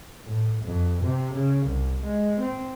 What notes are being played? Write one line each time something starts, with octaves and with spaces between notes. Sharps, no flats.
A2
F2
C3
C#3
C2
G#3
C4